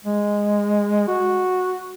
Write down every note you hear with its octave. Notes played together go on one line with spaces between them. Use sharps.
G#3
F#4